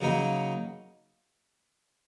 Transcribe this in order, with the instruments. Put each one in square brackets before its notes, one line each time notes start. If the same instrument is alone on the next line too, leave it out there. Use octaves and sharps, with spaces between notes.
[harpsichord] C#3 F#3 A#3 D#4